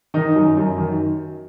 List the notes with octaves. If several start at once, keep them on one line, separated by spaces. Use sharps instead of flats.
D#3 D#4
F#2
F#2
D#3